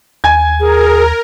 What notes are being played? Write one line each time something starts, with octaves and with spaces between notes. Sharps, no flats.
D#2 G#5 G#6
G#4 A#4